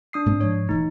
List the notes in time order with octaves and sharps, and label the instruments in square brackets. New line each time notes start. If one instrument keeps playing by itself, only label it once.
[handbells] D4 D#6 C7
[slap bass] G#2 A3 C4
[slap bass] G#2 F3 [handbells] C#5
[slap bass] D#1 E3 A3 [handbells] D#4